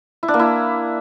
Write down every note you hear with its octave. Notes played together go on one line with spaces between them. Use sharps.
E4
D4
A#3
E4